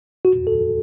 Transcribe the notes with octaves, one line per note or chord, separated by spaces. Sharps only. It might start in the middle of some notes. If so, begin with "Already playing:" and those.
F#4
A4